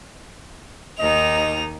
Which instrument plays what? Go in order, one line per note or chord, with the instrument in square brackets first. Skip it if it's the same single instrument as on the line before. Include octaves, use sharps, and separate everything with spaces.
[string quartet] D#2 D#3 [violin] D#4 F7 [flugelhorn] D#5